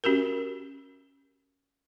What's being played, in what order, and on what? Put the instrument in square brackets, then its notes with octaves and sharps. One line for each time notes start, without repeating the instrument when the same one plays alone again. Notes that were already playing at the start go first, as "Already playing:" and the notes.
[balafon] C#4 F#4 G4 A#4